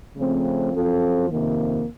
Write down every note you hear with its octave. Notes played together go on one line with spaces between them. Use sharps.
C#3 F3 A3 C4
F#2 F3 C4 F4 A4
F2 C3 D#3 A#3